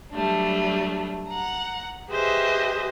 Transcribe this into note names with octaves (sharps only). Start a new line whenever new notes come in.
F#3 G3 A3 D4
F#5 A#5
G4 G#4 B4 C5 D#5 E5